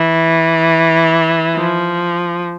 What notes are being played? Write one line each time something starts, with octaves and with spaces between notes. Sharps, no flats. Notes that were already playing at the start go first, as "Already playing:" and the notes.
Already playing: E3
F3